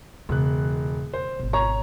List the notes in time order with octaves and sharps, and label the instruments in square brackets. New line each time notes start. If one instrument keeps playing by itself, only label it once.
[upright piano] E1 F#6 [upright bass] C#3 E3
[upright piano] C5
[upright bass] G#1 B2
[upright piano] C#5 A#5 C#6